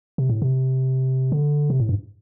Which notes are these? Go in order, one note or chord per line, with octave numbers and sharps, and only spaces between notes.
C3
A2
C3
D3
C3
A2
G2